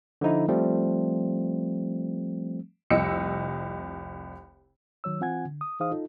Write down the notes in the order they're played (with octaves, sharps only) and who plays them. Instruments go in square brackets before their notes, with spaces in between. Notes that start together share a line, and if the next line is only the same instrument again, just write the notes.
[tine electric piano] D3 F3 D#4 E4
F3 G3 A3 C4
[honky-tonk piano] F1 C2 D#5 E6 C#7
[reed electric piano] D#3 F#3 C#5 E6
E3 C4 F4 F#5 G#5 G#6
D3
D#6
E3 D#4 G#4 C5 F5 D#6
D#4 F4 A4